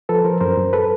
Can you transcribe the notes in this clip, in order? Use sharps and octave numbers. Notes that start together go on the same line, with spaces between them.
F3 A4 B4
F3 A#4 C5
F#2 A#4 C5
F#2
A4 B4